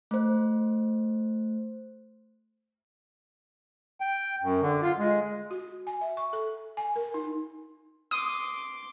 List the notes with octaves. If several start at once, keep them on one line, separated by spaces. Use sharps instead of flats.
A3 C5
G5
F#2
D3
F4
G#3
F#4
G#5
E5
C#6
A4
G#5
A#4
D#4
C6 D6 D#6